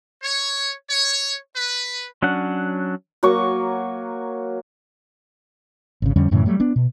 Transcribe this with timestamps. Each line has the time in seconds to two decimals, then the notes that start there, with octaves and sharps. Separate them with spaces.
0.23 C#5
0.89 C#5
1.55 B4
2.23 F#3 C#4 D4 F#5
3.23 F#3 A#3 F#4 C#6
6.02 G#1 C#3
6.16 F2 D3 G3 C#4
6.31 F#2 A2 C#3 E3
6.46 F#3 G3 A3
6.60 B3 D4
6.76 B2